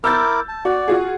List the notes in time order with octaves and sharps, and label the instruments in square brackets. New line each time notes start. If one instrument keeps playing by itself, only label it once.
[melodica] E4 A#4 D6 [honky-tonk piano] E6 G6 A6
[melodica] A5
[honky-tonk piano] F#4 [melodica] D5
[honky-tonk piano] F4 F#4 G#4